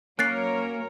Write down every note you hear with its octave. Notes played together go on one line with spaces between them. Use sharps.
F#3 A#3 C#4 A#4 C#5 F#6 A6 C7